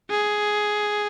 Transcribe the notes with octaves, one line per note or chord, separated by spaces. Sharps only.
G#4